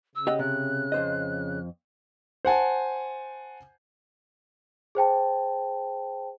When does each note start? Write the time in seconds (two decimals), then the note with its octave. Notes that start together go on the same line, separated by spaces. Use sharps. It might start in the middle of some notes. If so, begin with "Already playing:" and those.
0.15 C#3 E6
0.27 G4 D#5 F#5
0.39 C3 F#6
0.92 F2 C5 D#5
2.45 C5 F#5 G#5 A5
4.95 G#4 C5 G5 A5